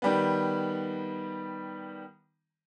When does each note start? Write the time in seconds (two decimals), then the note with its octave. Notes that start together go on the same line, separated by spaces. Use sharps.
0.02 D#3 G3 B3